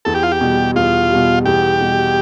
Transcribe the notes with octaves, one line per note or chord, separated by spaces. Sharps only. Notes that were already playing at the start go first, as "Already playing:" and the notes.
E2 A4
G4
F4
G4
B2 G3
E2 F4
B2 G3
E2 G4
B2 G3